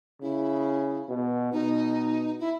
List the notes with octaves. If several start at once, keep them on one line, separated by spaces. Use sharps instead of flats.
C#3 E4
B2
B2 D#4
E4